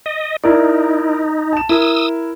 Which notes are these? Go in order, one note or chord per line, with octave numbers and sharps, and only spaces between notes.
D#5
D#4 E4 A#4 D5
A5 E7
E4 A#4 D#6 E6